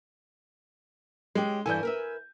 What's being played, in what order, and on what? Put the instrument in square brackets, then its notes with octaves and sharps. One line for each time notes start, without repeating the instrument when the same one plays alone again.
[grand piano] G#3 [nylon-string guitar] C#4 G4
[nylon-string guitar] G2 E3 A4 [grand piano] G#5 G6
[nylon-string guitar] A#4 B4 E5